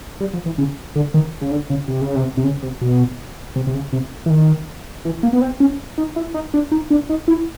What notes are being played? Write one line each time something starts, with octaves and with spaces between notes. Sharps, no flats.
G3
F3
E3
C#3
D3
D#3
C#3
D3
C#3
C3
C#3
C3
C3
C#3
C3
B2
C3
C3
C#3
C3
E3
D#3
E3
A#3
B3
C4
C#4
D#4
E4
D#4
D4
D#4
D4
D#4
E4